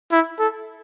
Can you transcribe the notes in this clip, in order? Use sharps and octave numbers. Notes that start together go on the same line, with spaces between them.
E4
A4